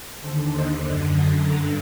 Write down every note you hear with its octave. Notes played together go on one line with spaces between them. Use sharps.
D#2 D3 A4 C5
C5 D#5
F#2 D3
C6 D#6
G2 D3 A#5 D6